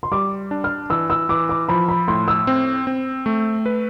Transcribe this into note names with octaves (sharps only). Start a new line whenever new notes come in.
C6
G3 D6
D4
F6
E3 E6
E6
E3 D6
D6
F3 B5
B5
A2 C6
E6
C4
C4
A3
B4